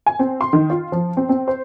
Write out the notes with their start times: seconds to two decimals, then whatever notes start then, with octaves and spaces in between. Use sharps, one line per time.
0.06 G#5
0.19 C4
0.41 C6
0.53 D#3
0.70 F4
0.92 F3
1.17 C4
1.29 C4
1.48 C5